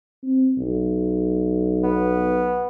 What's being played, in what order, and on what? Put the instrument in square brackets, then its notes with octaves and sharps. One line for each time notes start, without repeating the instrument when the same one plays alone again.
[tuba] C4
B1
[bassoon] B3